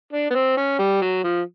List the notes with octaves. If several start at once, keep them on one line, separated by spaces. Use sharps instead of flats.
D4
B3
C4
C#4
G3
F#3
F3